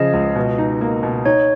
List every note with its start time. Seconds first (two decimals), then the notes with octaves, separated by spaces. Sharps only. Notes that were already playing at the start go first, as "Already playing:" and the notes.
Already playing: C#3 F3 D#5
0.13 C#2
0.36 B2
0.58 D#4
0.81 A#3
1.03 B2
1.25 D#4 C#5